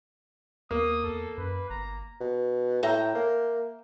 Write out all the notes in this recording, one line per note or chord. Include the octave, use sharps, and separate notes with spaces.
D#2 A#3 D#6
E2 A4
F#2 B4
G1 A#5
B2
A2 E5 G5 A#5
A#3